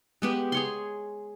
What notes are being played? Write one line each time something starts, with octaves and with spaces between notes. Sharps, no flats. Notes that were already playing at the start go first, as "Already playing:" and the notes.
G#3 B3 G4
G#4 C#5 C6